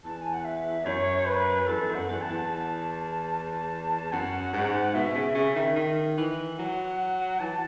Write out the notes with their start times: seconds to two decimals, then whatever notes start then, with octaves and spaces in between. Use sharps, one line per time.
0.04 E2 A5
0.21 G#5
0.34 F#5
0.45 E5
0.85 F#2 C#5
1.26 B4
1.67 E2 A4
1.88 F#2
1.94 F#5
2.08 E2
2.21 A5
2.29 E2
2.49 A5
3.30 A5
4.12 F#2 F#5
4.53 G#2
4.94 B2 E5
5.15 C#3
5.35 C#3 E5
5.56 D#3
5.76 D#3
6.17 E3
6.58 F#3 F#5
7.40 E3 A5